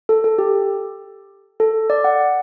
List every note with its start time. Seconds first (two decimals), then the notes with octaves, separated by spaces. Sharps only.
0.09 A4
0.24 A4
0.38 G4
1.60 A4
1.90 D5
2.04 F#5